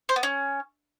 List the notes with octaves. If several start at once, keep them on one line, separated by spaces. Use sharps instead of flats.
C5
B3
C#4